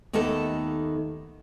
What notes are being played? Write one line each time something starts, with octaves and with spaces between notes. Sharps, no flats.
D#2 D#3 A3 B3 A4 E5